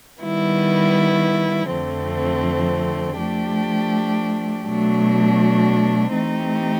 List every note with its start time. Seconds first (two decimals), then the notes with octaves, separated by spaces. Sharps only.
0.23 D#3 G3 B3 E4
1.71 F2 D3 F3 A3 C4
3.19 F3 A3 D4 G4
4.67 B2 F#3 A3 D4
6.15 E3 A3 C4 D#4 G4